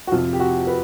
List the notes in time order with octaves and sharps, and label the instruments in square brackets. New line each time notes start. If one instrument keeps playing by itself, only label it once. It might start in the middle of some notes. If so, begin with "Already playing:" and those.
[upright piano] F#4
F2 C3 F3 F4
G4
F#4
B4